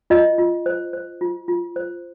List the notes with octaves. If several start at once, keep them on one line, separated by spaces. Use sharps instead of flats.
F4 D#5
F4
C5
C5
F4
F4
C5